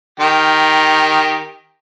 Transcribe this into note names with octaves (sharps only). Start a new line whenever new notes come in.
D#3 G4